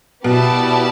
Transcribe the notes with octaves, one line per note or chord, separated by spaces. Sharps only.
B2 B3 E4 G4 D5 A5